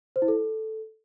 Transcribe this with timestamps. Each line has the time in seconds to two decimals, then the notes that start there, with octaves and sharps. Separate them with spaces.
0.16 C5
0.22 E4
0.28 A4